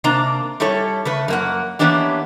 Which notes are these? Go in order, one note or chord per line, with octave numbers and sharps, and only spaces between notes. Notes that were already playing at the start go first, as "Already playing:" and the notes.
C3 A#3 D4 A#5
G3 C#4 E4 A4 C#5
C#3 A3 B4
F#2 A#3 F#5
E3 A#3 B3 C#4 D4 G4